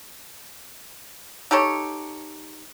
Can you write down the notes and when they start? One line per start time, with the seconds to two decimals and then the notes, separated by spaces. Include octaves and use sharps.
1.51 D#4 G4 A4 C#5